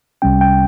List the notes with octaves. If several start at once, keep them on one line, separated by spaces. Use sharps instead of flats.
C2 C3 G3 C#4 G5
G5